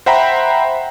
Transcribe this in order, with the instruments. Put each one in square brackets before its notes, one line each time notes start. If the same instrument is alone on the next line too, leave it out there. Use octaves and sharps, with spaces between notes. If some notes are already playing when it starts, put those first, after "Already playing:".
[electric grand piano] C5 E5 F#5 G5 A#5 B5